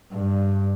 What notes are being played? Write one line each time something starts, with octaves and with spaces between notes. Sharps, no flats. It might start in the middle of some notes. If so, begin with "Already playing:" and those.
G2